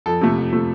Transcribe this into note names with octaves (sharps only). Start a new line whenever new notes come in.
F2 A4
C3 F3 A3
F2
C3 F3 A3